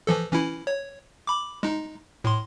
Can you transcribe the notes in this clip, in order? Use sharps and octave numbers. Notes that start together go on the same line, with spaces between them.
E3 F3 A4
E3 C#4 E4
C#5
B5 D6
G#3 D#4
A2 C6